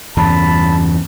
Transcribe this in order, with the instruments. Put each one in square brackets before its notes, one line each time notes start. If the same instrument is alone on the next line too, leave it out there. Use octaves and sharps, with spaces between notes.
[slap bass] E2 G2 C#3 [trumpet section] A5 B5